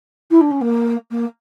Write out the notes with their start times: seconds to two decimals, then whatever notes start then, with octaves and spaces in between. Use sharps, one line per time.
0.31 E4
0.41 D4
0.51 C#4
0.61 A#3
1.11 A#3